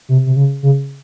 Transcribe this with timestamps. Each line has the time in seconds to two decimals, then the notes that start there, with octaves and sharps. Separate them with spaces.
0.09 C3
0.26 C3
0.36 C#3
0.63 C#3